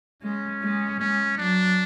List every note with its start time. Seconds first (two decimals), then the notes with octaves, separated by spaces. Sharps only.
0.22 G#3 C#4
0.62 G#3
1.00 G#3 C#4
1.38 F#3 D4